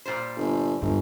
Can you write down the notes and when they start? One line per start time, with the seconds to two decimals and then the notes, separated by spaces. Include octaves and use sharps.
0.05 A#2 G3 C5
0.37 G1
0.82 G1 G2